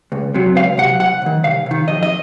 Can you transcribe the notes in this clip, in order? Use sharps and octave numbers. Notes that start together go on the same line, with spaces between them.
C#2
C3 F#3
C#2 F5
C3 F#3 F#5
C2 F#5
C3
D#3
C2 F5
C3 D#3
F2 D#5
D#5